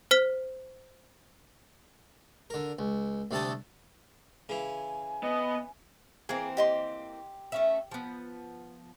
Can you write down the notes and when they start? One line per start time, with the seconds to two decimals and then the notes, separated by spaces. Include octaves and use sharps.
0.11 C5 F6 B6
2.50 D3 A#4
2.79 C#2
3.31 D2 C3 G3 A3 A5 D#6
4.49 C#3 E3 G#5
5.23 B3 D#5
6.29 E3 A#3 C4 G#4 A#4
6.57 G4 D#5 C6
7.52 A3 C#4 E5
7.91 F3 B3